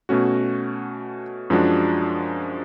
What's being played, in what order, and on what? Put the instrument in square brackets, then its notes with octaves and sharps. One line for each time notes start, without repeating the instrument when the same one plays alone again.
[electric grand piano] B2 A3 C#4 F#4
F#2 F3 G#3 D4 F#4